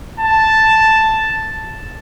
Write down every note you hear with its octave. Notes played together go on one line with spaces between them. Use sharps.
A5